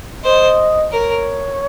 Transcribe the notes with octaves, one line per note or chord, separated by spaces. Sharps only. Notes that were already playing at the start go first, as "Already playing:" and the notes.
C5 D#5
A#4 C#5